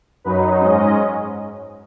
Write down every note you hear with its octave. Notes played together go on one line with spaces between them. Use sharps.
F#2 F#3 D#4 B4
G#2 G#3 C#4 D#5